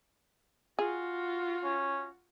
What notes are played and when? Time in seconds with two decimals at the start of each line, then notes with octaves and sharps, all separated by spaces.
0.79 F4 F#4 G#4
1.64 C#4